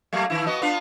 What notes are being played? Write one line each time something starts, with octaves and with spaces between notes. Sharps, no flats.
F#3 A3 A#3
D#3 E4
B3 F#4 D#5
B3 D4 F4